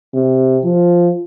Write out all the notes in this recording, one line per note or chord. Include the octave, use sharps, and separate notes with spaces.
C3
F3